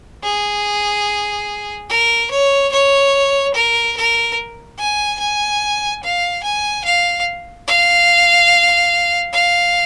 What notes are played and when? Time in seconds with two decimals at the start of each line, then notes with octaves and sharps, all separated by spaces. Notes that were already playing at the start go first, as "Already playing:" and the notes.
0.24 G#4
1.89 A#4
2.31 C#5
2.72 C#5
3.54 A#4
3.97 A#4
4.79 G#5
5.19 G#5
6.03 F5
6.43 G#5
6.85 F5
7.68 F5
9.33 F5